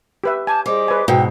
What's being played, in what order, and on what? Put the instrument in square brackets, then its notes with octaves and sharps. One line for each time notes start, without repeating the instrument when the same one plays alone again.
[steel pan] G4 B4 E5
[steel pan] G#5 [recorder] A5 [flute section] D6 G6
[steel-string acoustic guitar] G3 [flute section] G#4 C5 D#5 [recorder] D6
[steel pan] B4 G#5
[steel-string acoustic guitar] G#2 B2 [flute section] F#4 E6 [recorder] G5